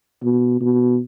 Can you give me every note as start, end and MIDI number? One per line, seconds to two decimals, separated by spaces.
0.23 0.56 47
0.61 0.98 47